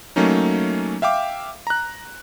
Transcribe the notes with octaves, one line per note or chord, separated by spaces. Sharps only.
F#3 A3 A#3 C#4 D#4
E5 F5 G5 D6
A#5 F#6